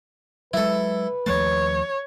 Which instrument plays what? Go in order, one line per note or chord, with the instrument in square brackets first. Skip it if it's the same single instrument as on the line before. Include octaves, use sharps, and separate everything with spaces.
[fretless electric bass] F#3 G#3 [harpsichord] E4 A4 [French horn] B4
[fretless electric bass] D#2 F3 A3 [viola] C#5 [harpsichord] A5